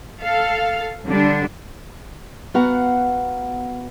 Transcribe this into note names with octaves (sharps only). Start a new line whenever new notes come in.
A4 F5
D3 G3 D4
B3 F#4 F5 F#5 A#5